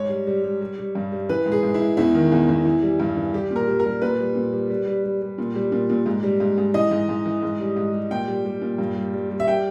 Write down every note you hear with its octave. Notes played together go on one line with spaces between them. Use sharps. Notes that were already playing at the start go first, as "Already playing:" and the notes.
Already playing: G#2 C#5
G3
G3
G3
G3
G3
G2
G3
E3 B4
G#2
G#4
G#2
E4
G#2
E2 E4
D#3
E2
E2
E3
G3
G2
E3
G3 G4
A#2
A#4
G3
A#4
G3
A#2 B4
G3
A#2
G3
G3
G3
G3
G3
A#2
G3
A#2
A#2
G#2
G3
G#2
G#2
E3 D#5
G#2
G#2
E3
G#2
G3
G#2
G3
A#2 G5
G3
G3
A#2
G2
G3
G3
G3
E5
G3 G5